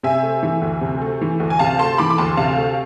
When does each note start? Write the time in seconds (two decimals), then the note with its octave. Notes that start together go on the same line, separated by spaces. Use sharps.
0.03 C3 E5 G#5
0.23 A3
0.43 E3
0.62 D2
0.81 C3
1.02 A3
1.21 E3
1.40 D2
1.50 G#5
1.59 C3 F5 A5
1.79 A3 A5 C6
1.98 E3 B5 D6
2.10 D6
2.18 D2 A5 C6
2.37 C3 F5 A5
2.58 A3